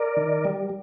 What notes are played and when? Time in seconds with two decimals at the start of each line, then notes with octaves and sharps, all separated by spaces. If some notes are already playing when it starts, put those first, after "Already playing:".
Already playing: A#4 D5
0.17 D#3
0.45 G3